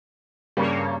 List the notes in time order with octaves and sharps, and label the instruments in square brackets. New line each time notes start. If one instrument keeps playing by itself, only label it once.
[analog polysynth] G2 A#3 C#5 [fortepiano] C#3 G3